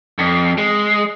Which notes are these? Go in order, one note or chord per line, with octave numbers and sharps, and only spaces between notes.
F2
G#3